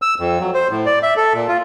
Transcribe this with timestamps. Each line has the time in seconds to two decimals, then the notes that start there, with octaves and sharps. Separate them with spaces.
0.02 E6
0.20 F2
0.40 F#3
0.54 C5
0.71 A2
0.86 D5
1.03 E5
1.17 A4
1.34 A#2
1.48 F4